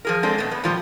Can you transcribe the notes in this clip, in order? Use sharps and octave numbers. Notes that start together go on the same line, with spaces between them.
F3 G#4 A#4
G#3 C4 D4 A4
B2 A3
B3
A#2 F3 G3